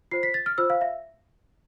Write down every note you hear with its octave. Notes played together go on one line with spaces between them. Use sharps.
F4 C5 C7
B6
A6
F6
F4 C5 E6
F5
E5